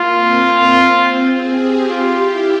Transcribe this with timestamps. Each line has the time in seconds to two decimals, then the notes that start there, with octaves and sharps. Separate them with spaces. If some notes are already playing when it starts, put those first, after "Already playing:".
Already playing: A#3 F4
0.14 C4
1.31 G#4
1.61 G4
1.89 F4 G4
2.19 E4